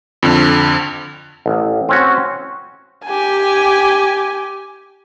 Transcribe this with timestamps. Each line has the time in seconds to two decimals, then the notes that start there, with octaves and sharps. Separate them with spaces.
0.23 F2 D3
1.46 A1
1.89 C4 C#4 F#4
3.06 G4 G#5